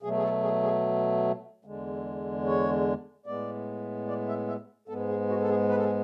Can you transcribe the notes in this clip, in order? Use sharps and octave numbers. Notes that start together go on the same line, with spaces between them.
B2 F#3 A3 G#4
G#4
A4
G#4
G#4
E2 D3 G#3
C#5
A2 G#3 B3 D5
D5
E5
E5
G#2 G#3 B3 A4
G#4
F#4
A4
G#4
B4
A4
G#4